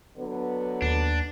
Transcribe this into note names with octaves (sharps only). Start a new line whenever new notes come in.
D3 F#3 B3
D#2 D4